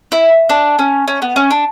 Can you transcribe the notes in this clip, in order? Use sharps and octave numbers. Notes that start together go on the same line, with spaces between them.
E4
D4
C#4
C#4
B3
C#4
D4